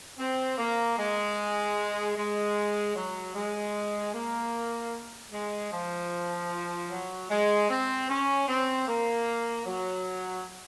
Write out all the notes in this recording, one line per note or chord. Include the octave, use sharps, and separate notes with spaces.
C4
A#3
G#3
G#3
F#3
G#3
A#3
G#3
F3
F#3
G#3
C4
C#4
C4
A#3
F#3